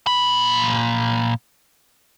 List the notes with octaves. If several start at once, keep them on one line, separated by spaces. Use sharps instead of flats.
A#2 B5